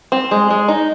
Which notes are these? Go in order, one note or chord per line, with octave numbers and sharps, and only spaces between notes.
C4
G#3
G#3
D#4